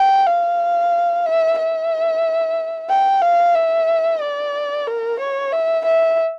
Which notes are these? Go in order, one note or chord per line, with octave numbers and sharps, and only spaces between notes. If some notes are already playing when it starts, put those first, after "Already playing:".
Already playing: G5
F5
E5
E5
G5
F5
E5
D5
A#4
C#5
E5
E5